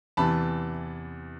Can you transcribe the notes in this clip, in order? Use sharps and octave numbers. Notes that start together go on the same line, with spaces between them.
E2 C3 E3 A5 B5